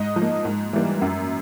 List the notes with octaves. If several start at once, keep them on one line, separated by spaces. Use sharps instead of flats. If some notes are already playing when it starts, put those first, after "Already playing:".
Already playing: G#2 D#5
F3
A#3
G#2
E3 G3 A#3
F#2